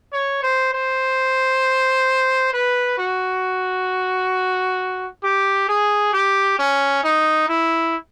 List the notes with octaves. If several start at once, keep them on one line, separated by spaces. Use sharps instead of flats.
C#5
C5
C5
B4
F#4
G4
G#4
G4
C#4
D#4
E4